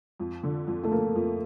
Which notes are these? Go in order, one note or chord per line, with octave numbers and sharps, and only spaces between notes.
F2
D3
F2
A3
F3 A#3
F2